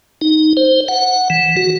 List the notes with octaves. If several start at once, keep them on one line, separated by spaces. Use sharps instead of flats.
D#4
C5
F#5
E3
F#4